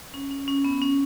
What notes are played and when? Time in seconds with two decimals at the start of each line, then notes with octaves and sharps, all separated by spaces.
0.14 C#4
0.31 C#4
0.48 C#4
0.65 B3
0.82 C#4